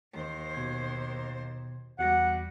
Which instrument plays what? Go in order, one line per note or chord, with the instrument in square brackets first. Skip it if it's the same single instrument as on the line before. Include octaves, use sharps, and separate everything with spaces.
[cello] D#2 C5
[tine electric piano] B2 G#6
[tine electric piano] E2 F#4 A#6 [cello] G3 [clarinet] F#5